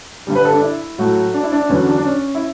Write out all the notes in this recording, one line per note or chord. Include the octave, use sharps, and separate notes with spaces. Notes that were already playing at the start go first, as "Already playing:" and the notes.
G2 D3 G3
B4
A4
D4
E4
A2 F#3 A3 F#4
D4
E4
D4
E2 D3 F#3 B3 C#4
D4
D4
C#4
E4